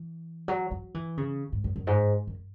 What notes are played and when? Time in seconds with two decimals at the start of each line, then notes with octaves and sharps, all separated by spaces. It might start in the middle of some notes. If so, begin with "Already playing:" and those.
Already playing: E3
0.48 F#3
0.71 F#3
0.94 E3
1.17 C#3
1.52 G#2
1.64 F#2
1.76 F#2
1.87 G#2
2.27 F#2